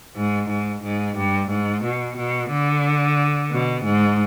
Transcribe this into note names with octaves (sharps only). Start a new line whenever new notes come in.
G#2
G#2
G#2
G2
G#2
B2
B2
D3
B2
G#2